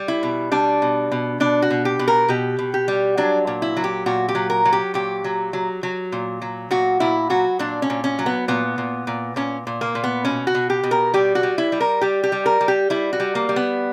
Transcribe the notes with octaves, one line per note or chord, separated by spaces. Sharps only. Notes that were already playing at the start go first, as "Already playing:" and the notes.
Already playing: G3
E4
B2
G3 D4
B2
B2
B2 D4
F#4
B2
G4
B2
A#4
B2 G4
B2
G4
G3
F#3 D4
A#2
E4
F#3
G4
A#2 F#4
G4
F#3
A#4
F#3
G4
A#2 G4
F#3
F#3
F#3
A#2
F#3
A#2 F#4
A#2 E4
F#3 F#4
A#2 D4
C#4
A#2
C#4
F#3
B3
A#2 B3
A#2
A#2
A#2 C#4
A#2
A#3
A#2
B3
B2 C#4
F#4
B2
G4
B2
A#4
G3 G4
F#4
G3
E4
G3
A#4
G3 G4
G4
G3
A#4
G3
G4
G3 E4
F#4
G3
A#3
G3
B3